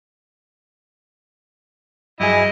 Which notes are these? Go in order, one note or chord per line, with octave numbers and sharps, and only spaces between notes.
G2 F#3 E4 G#4 D#5